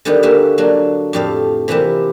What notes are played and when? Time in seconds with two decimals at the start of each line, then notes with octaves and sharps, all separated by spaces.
0.05 D3 D#3 G3 B3 G4
0.23 A#3 F#4 G4 E5 G#5
0.58 F#3 A#3 D4
1.13 F2 A2 G4 A4 F5
1.68 C3 E3 A#3 E4 G4